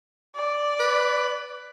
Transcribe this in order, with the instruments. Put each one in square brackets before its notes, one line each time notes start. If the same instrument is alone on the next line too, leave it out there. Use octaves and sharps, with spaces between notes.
[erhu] D5
[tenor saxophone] B4